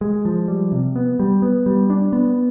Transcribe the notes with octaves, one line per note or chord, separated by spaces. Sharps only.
G#3
F3
G3
C3
B3
G3
B3
G3
D4
B3